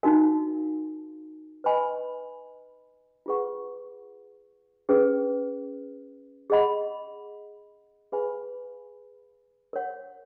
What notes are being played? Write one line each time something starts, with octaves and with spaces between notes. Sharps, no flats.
D#4 F#4 A#4 F5 G#5
B4 D#5 G#5 B5
F4 G#4 B4 F#5 C#6
C#4 G#4 B4
G#4 D#5 F#5 B5
G#4 B4 F5 G#5 B5
A#4 C#5 F#5